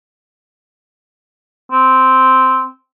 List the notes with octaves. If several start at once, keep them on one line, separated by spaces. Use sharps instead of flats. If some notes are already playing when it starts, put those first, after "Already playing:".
C4